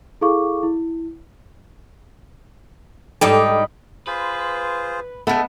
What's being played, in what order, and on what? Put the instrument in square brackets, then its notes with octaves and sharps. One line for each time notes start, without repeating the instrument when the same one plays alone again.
[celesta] E4 G#4 A4 F5 C#6 D6
E4
[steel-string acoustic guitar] G#2 D#4 G5 [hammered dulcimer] G3 D#5 B5 [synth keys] A4 D6
[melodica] F4 G#4 C5 [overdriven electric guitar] B4
[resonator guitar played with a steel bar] G#3 A3 [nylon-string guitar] B3